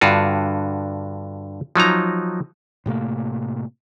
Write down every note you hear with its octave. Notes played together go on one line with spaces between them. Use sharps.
G2 D3 F4 F#4
F3 F#3 D#4 A#5
A2 C3 A3 A#3